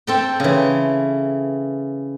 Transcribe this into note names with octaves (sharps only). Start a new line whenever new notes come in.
C4 A4 G5
C#3 E3